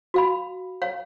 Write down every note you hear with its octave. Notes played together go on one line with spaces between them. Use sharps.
F#4 F5 B5
C#5 F5